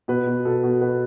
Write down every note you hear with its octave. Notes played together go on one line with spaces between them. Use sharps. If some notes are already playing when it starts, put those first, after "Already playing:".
B2 B4
B2
B2 A4
B2
B2 B4